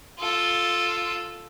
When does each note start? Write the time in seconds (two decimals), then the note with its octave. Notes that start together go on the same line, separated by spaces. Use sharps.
0.19 F4 A4